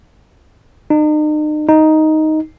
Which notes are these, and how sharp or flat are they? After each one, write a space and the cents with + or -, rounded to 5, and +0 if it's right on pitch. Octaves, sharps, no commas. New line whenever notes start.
D#4 -40
D#4 +5